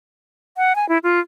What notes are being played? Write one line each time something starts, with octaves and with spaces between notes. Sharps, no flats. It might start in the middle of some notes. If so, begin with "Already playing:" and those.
F#5
G#5
E4
F4